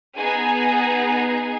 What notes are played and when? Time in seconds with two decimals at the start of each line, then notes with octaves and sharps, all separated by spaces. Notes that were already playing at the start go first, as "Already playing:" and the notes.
0.16 B3 D#4 G#4 G#5
1.06 G#5